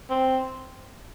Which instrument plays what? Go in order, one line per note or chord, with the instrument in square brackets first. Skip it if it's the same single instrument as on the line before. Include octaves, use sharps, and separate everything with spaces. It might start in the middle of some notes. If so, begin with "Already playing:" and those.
[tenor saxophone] C4